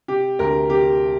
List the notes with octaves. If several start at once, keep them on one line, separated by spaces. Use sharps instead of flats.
C3 G4
D2 A#4
C3 G4